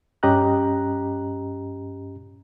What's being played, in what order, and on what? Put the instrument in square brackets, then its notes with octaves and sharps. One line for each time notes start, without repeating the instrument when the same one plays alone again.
[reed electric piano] G2 C#4 G4 D#5 A#5 F#6